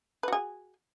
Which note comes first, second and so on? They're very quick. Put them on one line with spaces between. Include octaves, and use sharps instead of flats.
B4 F#4 G#4